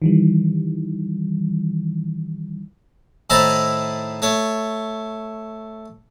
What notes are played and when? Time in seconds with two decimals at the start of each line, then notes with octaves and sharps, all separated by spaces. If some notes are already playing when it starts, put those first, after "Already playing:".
0.02 D#3 E3 G3
3.30 A2 D#3 E4 C5 A5 A#5
4.22 A3 C#5